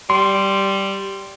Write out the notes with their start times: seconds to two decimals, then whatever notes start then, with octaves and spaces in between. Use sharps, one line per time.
0.10 G3 C6